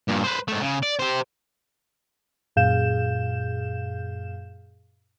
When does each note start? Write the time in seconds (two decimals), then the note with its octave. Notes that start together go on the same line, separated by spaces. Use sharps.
0.08 G2 A#2
0.24 B4 C5
0.48 G#2 A3
0.61 C#3
0.83 D5
0.99 G4 C5
2.56 F#2 A#2 G#4 F5 G6 E7